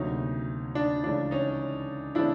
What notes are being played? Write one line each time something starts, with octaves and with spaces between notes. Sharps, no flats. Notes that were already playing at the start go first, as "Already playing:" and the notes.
Already playing: D2 C3 D#3 F#3 A#3 C#4 D#4
D4
C#2 C#3 E3 A3 D4
C#4 D#4
C#3 E3 A3 C4 D4 E4